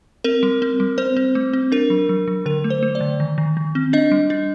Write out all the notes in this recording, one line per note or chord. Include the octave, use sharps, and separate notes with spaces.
C4 A#4
G3
C4
G3
C4 C5
C4
A3
C4
D4 A#4
F#3
F#3
F#3
D3 A#4
A3
C5
A3
D5
D3
D#3
D#3
D#3
C4
D4 D#5
G3
D4